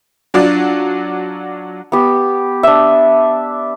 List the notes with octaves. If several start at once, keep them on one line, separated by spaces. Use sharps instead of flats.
F#3 D4 F4 F#4 D5
B3 G4
D4 E5